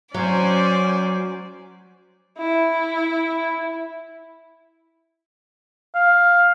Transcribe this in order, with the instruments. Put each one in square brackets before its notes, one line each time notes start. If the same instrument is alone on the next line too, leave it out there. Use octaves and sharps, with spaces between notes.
[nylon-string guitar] F#3 [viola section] C#4 C5 G#5 [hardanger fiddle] D5
[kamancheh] E4
[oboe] F5